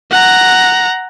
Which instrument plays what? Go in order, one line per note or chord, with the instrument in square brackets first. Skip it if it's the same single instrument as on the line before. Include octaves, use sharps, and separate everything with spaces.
[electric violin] F#5 A#5